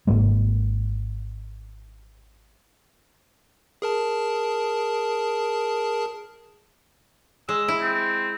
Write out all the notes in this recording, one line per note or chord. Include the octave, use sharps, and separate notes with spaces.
G#1 G#2 G#3 A#3
G#4 A#4 A5
G#3 E6
E4
C4